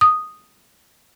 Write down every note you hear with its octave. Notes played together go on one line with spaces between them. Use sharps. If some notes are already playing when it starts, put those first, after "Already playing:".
D#6